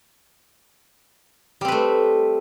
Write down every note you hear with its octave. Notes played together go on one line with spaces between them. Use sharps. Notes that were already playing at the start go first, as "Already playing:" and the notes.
G3 A3 C4 B4